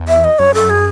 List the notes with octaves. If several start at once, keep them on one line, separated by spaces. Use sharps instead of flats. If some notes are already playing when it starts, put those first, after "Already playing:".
Already playing: E2
E5
D#5
F#2 C#5
A4
G#4